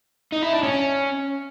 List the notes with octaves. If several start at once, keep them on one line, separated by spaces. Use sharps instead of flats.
D#4
E4
D4
C#4